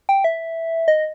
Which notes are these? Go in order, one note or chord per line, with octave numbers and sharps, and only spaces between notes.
G5
E5
D#5